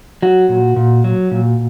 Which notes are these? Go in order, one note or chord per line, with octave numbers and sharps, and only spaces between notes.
F#3 F#4
A#2
A#2
F#3
A#2